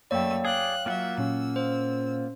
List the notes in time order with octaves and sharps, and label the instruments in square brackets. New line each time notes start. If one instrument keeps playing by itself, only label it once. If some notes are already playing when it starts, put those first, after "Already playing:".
[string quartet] F#2 A3 E6 [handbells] A#3 D5 [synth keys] C#5 G5
[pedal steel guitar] G#4 D5 [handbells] F5 [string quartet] F#6
[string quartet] F#3 E5 [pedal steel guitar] A#3 F4 F#5
[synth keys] A#2 C#4 [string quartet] E6
[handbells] C5